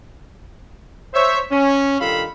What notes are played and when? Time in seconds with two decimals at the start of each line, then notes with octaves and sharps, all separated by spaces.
1.14 C5 C#5 E5
1.50 C#4
1.99 G2 D#3 F4 A4 F5 B5